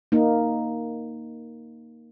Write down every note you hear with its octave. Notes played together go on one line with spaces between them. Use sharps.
A#3 D#4